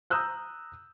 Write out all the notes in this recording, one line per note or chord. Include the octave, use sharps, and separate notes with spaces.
A#5 D#6 E6 F#6 G6